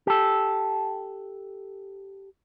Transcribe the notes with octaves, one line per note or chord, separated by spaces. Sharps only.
G4 A4